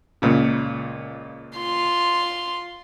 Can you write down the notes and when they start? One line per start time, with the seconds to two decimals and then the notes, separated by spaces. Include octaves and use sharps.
0.22 C#2 A#2 C#3
1.57 F4 C6